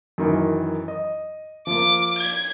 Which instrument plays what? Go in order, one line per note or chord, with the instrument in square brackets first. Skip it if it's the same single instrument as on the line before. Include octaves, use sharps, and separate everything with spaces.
[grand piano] F#2 D#3 E3
D#5
[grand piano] F3 A#3 [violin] D6
[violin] G#6